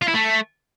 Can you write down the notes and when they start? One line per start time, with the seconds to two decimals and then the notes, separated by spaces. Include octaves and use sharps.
0.02 F4
0.08 E4
0.14 A3